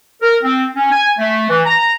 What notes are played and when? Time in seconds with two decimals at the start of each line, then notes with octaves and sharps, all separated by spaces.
0.22 A#4
0.43 C4
0.76 C#4
0.92 G#5
1.18 A3
1.50 E3
1.65 A#5